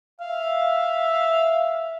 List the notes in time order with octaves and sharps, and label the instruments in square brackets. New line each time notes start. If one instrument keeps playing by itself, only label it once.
[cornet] E5 [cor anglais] F5